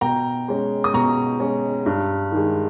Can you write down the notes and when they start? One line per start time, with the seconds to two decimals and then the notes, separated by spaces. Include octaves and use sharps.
0.01 B2 G5 A#5
0.48 G#3 C#4
0.84 D#6
0.94 B2 A#5 C#6
1.40 G#3 C#4
1.86 G2
2.32 D#3 G#3